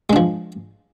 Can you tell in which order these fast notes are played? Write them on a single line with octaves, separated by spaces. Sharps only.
G#3 D4 F3